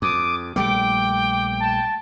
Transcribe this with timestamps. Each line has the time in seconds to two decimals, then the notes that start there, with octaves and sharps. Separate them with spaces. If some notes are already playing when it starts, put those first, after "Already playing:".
0.02 F2 D6 D#6
0.56 A#1 G3 A3 G5 D6
1.60 A5